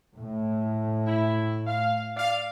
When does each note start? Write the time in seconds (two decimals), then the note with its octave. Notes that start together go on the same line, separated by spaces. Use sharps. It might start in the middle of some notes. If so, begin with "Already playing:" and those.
0.18 A2
1.06 E4
1.66 F5
2.16 D5 F5